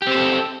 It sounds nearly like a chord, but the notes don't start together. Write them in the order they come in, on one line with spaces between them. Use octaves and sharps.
G4 C4 C5 A4